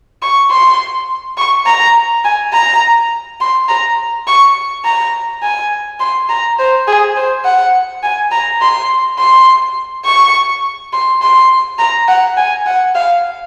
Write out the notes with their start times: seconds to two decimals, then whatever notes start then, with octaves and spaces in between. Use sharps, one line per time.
0.22 C#6
0.51 C6
1.37 C#6
1.66 A#5
2.25 G#5
2.53 A#5
3.41 C6
3.69 A#5
4.27 C#6
4.85 A#5
5.43 G#5
6.00 C6
6.29 A#5
6.59 C5
6.87 G#4
7.16 C5
7.45 F#5
8.03 G#5
8.31 A#5
8.62 C6
9.19 C6
10.05 C#6
10.93 C6
11.22 C6
11.79 A#5
12.08 F#5
12.37 G#5
12.66 F#5
12.95 F5